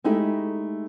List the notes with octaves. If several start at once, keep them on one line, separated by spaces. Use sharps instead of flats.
G#3 A3 D#4 E4 G4